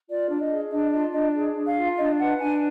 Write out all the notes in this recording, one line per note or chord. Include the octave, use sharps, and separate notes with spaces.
F4 D5
D4
D#5
G#4
D4 D#5
F4 D#5
D4 D#5
G#4
D4
F5
F4
D4 D#5
B4 F#5
D4 G#5